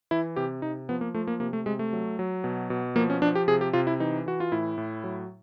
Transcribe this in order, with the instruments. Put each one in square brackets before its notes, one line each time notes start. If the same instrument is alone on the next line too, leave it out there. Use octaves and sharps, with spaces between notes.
[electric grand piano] E3 E4
C3 G4
C3 D#4
F3 B3
A#3
F3 A3
A#3
C3 A#3
A3
C3 G#3
A3
F#3
F#3
B2
B2
F3 A#3
C#4
F3 D4
G4
C3 G#4
G4
C3 F4
E4
E3 D#4
E3 F#4
F4
A2 E4
A2
F#3